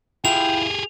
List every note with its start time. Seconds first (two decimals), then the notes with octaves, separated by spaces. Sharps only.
0.25 E4 F4 G4 G#4 G5 F7